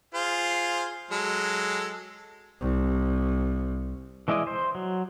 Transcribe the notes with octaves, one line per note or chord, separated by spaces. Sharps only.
F4 G#4 C5
F#3 G#3 A4
C2
E3 G#3 E4 D5 D#5
C5
F#3